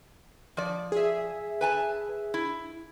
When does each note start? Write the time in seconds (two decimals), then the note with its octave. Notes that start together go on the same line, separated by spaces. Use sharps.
0.57 F3 D5
0.92 G#4 E5
1.61 B4 G#5 A5
2.34 E4